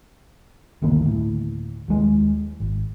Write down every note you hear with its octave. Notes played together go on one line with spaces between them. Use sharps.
G1 D2 D#3 A#3
D2 A2
D#2 G#3
G#1